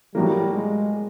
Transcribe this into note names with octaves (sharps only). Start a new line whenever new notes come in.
A2 F#3 G3 A#3
G#3